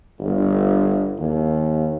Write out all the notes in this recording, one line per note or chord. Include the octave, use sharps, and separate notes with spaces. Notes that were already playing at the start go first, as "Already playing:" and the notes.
G1
D#2